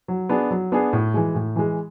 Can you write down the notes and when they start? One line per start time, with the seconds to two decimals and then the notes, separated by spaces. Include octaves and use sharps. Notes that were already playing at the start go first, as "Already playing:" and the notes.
0.08 F#3
0.29 B3 D4 G#4
0.51 F#3
0.72 B3 D4 G#4
0.93 A2
1.14 E3 G#3
1.35 A2
1.56 E3 G#3